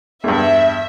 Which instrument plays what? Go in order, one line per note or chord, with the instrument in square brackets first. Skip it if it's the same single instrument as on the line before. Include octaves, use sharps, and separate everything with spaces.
[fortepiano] E2 G2 [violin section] E5